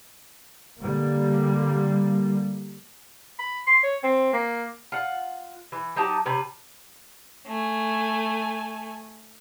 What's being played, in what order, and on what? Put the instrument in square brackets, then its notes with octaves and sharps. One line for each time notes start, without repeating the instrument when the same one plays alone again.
[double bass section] D3 G3 A#3
[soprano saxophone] B5
C6
C#5
C4
A#3
[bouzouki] F4 F#5
E3
F#3 D#4 G4 A5
C3 C#4 B4
[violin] A3 G#5